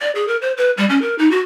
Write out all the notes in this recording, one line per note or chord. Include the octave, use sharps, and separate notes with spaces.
D5
G#4
A#4
C5
B4
G3
C#4
A#4
D#4
F#4